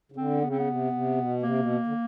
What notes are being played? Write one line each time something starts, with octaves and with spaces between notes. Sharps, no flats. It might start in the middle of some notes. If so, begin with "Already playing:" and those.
C#3
D3 C4
C#3 B3
C4
B3
C3
C3
B2
C3 A#3
B2
D3